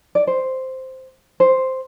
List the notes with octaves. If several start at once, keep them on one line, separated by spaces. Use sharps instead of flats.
D5
C5
C5